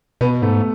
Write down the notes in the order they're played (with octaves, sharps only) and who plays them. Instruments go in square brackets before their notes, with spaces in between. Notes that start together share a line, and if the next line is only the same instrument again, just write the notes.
[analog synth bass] B2 [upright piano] B3
[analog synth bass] G#2 [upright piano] A3